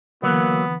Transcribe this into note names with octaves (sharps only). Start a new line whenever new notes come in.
D3 E3 F#3 A#3 B3